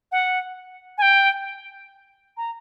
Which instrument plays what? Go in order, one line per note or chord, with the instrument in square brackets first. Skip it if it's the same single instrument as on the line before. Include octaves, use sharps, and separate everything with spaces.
[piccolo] F#5
G#5
G5
A#5